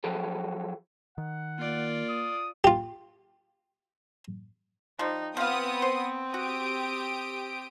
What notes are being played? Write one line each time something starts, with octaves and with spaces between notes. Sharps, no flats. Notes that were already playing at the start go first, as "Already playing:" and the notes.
F3 F#3 G#4 A4
D#3 F#5
A#3 F4 D5
D#6
F4 G4
F3 G3 D#4
F3 B3 C4 F5 D#6
C5
F#4 G4 D#6 D7